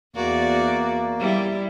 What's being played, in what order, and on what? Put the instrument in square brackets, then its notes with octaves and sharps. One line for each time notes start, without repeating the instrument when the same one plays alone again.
[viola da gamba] E2 F#4 D5 [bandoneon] A#3
[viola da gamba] G3 E4